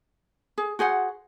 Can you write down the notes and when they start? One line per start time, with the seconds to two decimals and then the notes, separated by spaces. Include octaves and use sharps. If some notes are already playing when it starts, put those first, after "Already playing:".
0.58 G#4
0.79 F#4 G#4 C5 F#5